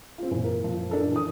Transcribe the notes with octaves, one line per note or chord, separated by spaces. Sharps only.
C4 F4
F#2 A#2 E3
A#4
F3
D4 A4 A#4
E3 D#6